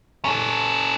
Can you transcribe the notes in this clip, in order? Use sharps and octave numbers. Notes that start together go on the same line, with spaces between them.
C#4 A4